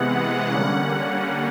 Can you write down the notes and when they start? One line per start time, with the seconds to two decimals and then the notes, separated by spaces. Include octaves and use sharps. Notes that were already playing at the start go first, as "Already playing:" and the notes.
Already playing: C3 E3 G#3 B3 F#5
0.48 D3 G3 A#3 C#4